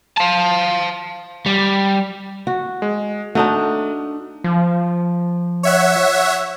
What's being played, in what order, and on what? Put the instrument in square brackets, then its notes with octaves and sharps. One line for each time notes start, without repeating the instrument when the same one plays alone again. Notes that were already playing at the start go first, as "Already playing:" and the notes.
[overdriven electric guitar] F5 A5
G3
[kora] F#4
[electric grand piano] G#3
[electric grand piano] A3 [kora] D4 D#4 F#4
[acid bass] F3
[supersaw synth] C#5 E5 F#5